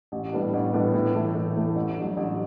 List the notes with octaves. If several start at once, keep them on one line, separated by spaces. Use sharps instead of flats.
A1
A2 G3 B3 D4
A1
A2 G3 B3 D4
A2
E3 A3
A2
E3 A3
A1
G2 F#3
A1